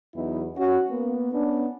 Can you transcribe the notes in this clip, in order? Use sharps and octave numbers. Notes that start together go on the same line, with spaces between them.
E2 F#3 B3 D#4 E4
C#4 F#4
A#3 B3
B3 C#4 D4